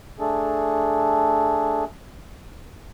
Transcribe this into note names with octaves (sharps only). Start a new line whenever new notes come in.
A3 D4 G#4 A4